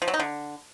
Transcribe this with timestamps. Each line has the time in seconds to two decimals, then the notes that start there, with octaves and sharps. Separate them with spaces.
0.02 F3
0.08 F#3
0.14 D#4
0.20 D3